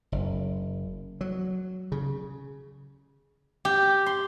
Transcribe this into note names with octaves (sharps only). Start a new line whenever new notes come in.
F#1
F#3
C#3
G4
C6